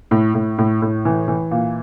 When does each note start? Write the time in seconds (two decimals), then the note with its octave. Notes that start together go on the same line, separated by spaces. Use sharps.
0.11 A2
0.35 A2
0.58 A2
0.82 A2
1.05 E3
1.28 E3
1.51 A#2